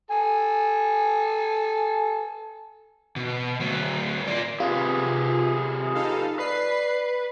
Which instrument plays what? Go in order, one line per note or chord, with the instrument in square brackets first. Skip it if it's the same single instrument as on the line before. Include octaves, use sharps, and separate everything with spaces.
[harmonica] A4 G#5
[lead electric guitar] B2
D2 F#3
F4 D5
[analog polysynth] C3 [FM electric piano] F4 [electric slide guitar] G4 G#4 B4
[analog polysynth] D#4 A4 F5
[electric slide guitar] B4 [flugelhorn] D5 [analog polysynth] C7